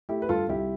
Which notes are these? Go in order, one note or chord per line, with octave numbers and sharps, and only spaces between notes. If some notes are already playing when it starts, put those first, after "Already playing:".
A3 E4 G4
B4
G2 F4 A4
C2 E4 G4